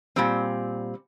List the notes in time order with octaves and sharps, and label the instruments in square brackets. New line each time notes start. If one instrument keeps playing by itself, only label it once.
[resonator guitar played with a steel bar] A#2 G3 C4